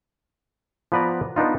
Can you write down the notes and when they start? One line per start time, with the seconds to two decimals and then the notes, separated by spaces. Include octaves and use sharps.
0.92 F3 B3 B4 D5 A#5
1.36 B3 D4 D#4 F4